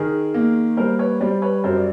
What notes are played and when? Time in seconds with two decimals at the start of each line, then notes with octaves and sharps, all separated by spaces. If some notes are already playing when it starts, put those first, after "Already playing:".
Already playing: D#3 G#4 A#4
0.34 A#3
0.77 G3 A#4 C5
0.99 B4 C#5
1.20 G3 C5 D5
1.42 B4 C#5
1.64 F#2 A#4 C5
1.76 D5